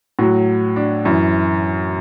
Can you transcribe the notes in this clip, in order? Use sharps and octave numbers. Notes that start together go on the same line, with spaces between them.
A2 F#3 F#4
D4
F#2 E3 E4